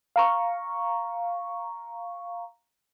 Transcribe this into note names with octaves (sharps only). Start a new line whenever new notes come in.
F5 A#5 C#6